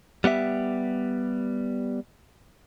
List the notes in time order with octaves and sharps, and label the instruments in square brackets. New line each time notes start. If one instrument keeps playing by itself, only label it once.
[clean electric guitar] G3 B3 G4 E5